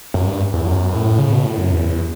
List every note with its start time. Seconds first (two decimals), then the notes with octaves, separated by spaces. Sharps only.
0.14 F#2
0.27 G2
0.54 E2
0.66 F#2
0.93 A2
1.18 C#3
1.32 B2
1.45 A2
1.58 F#2
1.72 E2